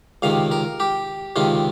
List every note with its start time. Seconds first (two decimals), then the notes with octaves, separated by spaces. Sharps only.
0.22 C#2 C3 D#3 F5
0.51 A#4
0.80 G4
1.36 C#2 C3 D#3 F4